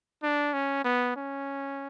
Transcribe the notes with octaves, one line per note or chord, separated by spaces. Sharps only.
D4
C#4
B3
C#4